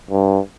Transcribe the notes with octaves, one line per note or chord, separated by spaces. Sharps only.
G2